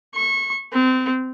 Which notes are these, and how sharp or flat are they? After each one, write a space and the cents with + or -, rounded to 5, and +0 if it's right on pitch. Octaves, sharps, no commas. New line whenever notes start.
C#6 -25
C4 -25